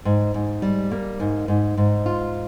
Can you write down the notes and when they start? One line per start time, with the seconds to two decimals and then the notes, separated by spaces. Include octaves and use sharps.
0.05 G#2
0.34 G#2
0.62 G3
0.91 A#3
1.20 G#2
1.48 G#2
1.77 G#2
2.06 F4